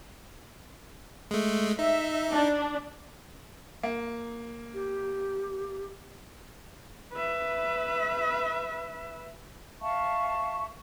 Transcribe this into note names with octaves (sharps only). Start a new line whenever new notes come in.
G#3 A3
D#4 E5
D4
A#3
G4
B4 E5
E5 F5 A5 C#6